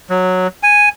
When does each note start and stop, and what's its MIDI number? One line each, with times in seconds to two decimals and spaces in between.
0.10 0.47 54
0.63 0.89 80